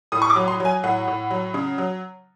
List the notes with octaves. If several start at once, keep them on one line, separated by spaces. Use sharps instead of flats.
A2 D#6
C#6
D6
F#3
C6
F#3 G#5
A2 F#5
A2
F#3
C#3
F#3